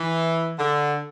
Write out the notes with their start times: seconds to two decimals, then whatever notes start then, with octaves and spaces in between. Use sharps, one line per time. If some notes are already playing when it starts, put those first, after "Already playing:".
Already playing: E3
0.59 D3